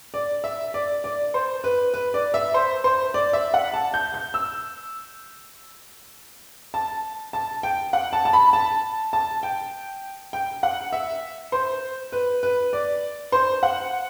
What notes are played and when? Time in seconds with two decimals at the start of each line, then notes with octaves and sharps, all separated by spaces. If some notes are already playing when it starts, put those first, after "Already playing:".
0.14 D5
0.44 E5
0.74 D5
1.04 D5
1.34 C5
1.64 B4
1.94 B4
2.14 D5
2.34 E5
2.54 C5
2.84 C5
3.14 D5
3.33 E5
3.54 F#5
3.74 A5
3.94 G6
4.14 G6
4.34 E6
6.74 A5
7.33 A5
7.63 G5
7.93 F#5
8.13 A5
8.25 A5
8.33 B5
8.53 A5
9.13 A5
9.43 G5
10.33 G5
10.63 F#5
10.93 E5
11.52 C5
12.12 B4
12.43 B4
12.73 D5
13.32 C5
13.63 F#5